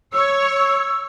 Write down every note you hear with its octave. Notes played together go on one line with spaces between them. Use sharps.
C#5 E6